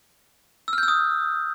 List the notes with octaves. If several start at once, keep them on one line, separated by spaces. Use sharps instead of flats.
E6
F6
G6
E6
D#6